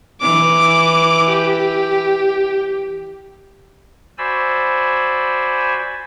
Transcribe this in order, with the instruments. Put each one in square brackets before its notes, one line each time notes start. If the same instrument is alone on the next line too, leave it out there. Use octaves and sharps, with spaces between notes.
[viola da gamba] E3 [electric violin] D6
[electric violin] G4
[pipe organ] F#4 C5 D5 G#5 B5 E6